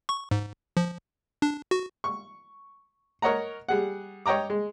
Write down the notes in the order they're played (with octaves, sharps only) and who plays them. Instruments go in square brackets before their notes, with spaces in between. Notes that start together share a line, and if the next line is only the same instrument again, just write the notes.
[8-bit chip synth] C#6
G#2
F3
D4
F#4
[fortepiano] C#6
A#4 C#5 D#5 F#5 A#5
G3 G#4 F#5
C#5 D#5 G5 A#5 D6
G#3